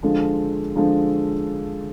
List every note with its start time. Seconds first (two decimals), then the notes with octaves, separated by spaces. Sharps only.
0.03 D3 F3 G#3 D4 A4
0.75 D3 F3 G#3 D4 A4